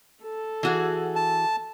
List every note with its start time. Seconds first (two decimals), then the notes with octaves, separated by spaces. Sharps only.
0.23 A4
0.63 E3 F#4 G#4
1.16 A5